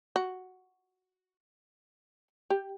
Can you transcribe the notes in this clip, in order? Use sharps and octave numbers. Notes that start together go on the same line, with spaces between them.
F#4
G4